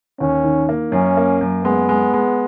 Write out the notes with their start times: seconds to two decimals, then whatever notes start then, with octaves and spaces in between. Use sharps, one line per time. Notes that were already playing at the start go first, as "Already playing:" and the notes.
0.20 D#2 C#4
0.44 D#3
0.69 A#3
0.92 F#2 C#4
1.17 A#3
1.41 F#2
1.64 G#3 B3
1.89 G#3
2.14 G#3